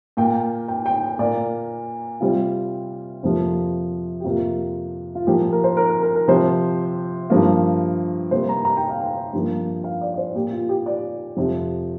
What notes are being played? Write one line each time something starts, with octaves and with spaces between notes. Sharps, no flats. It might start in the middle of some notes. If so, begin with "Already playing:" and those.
A#2 A#3 G5
G5
G5
A#2 A#3 D5
C3 G3 C4 F4
F2 C3 F3 A#3
G4
F2 C3 F3 A#3 F4
F4
A#2 F3 A#3 G4
A#4
C5
A#4
A#4
A#4
A#4
C3 F3 C4 C5
G2 F3 A#3
C3 G3 A#3 C5
A#5
A#5
G5
F5
G5
G2 F3 A#3
F5
D5
D5
C5
A#2 A#3 G4
F4
G4
D5
F2 C3 F3